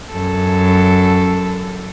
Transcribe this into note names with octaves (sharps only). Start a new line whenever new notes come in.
F#2 A4